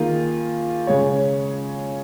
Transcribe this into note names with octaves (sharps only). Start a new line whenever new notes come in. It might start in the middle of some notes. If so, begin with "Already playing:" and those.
Already playing: D#3 A#3 F4 G#4
C#3 G#3 C#4 G#4 C#5